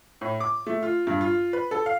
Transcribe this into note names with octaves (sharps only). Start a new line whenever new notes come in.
A2
D6
A3
F4
G2
F4
B4
A4
F5